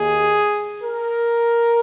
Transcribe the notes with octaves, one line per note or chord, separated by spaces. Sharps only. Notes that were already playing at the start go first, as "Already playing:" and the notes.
Already playing: D#2 D#3 A#3 G#4
A#4